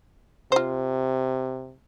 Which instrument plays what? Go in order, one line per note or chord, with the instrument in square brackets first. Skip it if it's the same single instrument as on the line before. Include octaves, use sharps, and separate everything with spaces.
[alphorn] C3 [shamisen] F4 C5